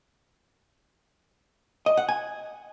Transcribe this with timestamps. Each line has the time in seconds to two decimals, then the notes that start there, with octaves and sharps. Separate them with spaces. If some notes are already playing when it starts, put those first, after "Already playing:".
1.86 D#5
1.97 F#5
2.08 G#5